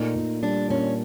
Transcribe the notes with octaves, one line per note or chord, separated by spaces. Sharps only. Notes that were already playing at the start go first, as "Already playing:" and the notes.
Already playing: A#2 A3 D#4
A#2
G3 D4
A#2 C#4